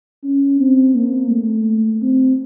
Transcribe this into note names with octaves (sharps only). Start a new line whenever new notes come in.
C#4
C4
A#3
A3
C4